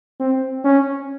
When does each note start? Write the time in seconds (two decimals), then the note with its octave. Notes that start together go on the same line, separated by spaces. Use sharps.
0.20 C4
0.65 C#4